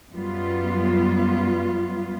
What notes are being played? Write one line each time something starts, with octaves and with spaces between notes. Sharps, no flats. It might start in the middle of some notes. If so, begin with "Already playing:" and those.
F#2 G3 B3 F4